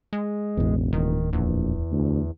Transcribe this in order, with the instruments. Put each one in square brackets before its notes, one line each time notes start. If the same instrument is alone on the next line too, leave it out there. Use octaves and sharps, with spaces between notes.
[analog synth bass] G#3
[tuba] E1 [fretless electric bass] A1 E2
[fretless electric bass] D1 [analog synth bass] D#3
[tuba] A#1 [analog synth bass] E2
[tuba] D2